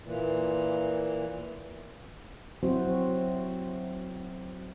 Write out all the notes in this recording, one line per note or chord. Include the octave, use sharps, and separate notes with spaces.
A#2 E3
F#3 C4 E4 F#4 C5